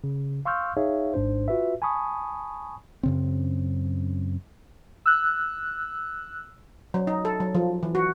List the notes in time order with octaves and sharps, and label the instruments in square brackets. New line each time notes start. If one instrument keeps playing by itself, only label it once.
[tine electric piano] C#3
F5 C6 C#6 E6 F6 G6
D#4 G#4 C#5 E5 F5
G#1 G#2 D4 C5
F4 F#4 B4 E5
G#5 A5 B5 C#6 D#6
[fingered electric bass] F#2 C#3 C4
[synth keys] E6 F#6
[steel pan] F#3
D#4
A4
F#3
F3
E3
F#4